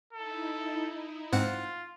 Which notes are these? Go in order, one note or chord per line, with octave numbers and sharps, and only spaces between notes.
D#4 E4 A4
G#2 C4 F4 F#5